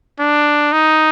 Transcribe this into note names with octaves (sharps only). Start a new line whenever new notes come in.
D4
D#4